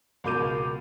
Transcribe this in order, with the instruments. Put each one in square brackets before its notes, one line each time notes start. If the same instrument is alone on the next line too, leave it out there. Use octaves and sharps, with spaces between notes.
[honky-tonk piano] C#2 B2 A#4 D6 G6 D#7